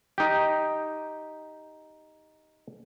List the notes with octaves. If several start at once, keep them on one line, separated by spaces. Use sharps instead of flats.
D#4 G4